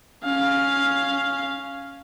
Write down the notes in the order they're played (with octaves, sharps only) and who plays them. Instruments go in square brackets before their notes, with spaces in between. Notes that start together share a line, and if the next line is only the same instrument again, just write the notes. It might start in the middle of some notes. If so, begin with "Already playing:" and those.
[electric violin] C#4 F5